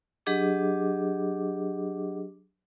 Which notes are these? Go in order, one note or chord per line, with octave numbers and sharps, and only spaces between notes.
F#3 D4 G4 G#4 D#5 D6